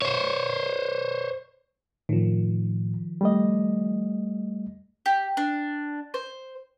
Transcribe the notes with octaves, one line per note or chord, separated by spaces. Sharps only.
C5 C#5
A2 D#3 F3
G3 A3 D#5
G4
D4
C5